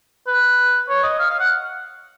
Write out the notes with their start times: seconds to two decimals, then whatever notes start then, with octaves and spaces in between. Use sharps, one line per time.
0.27 B4
0.89 C#5
1.03 D#5
1.19 F5
1.30 F5
1.40 F#5